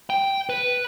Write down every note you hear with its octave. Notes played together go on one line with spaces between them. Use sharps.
G5
B4